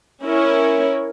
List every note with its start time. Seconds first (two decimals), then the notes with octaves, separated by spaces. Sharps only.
0.24 C#4 E4 A#4 C#5